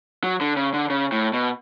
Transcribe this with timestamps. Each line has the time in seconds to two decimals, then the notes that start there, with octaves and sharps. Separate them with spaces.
0.24 F#3
0.41 D3
0.57 C#3
0.74 D3
0.90 C#3
1.12 A2
1.33 B2